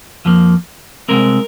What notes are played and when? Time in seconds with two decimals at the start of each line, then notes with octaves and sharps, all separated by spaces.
0.25 F2 F3 A#3
1.08 C2 A#2 G#3 C4 A#4